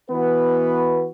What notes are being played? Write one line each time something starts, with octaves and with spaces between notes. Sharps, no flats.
E3 B3 F#4 B4